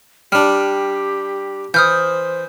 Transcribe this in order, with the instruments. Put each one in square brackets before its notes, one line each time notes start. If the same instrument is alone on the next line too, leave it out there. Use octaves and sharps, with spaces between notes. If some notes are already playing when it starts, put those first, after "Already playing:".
[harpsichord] G3 D4 [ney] G4 [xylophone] F6
[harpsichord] E3 [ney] C5 [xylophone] D#6 F6 G6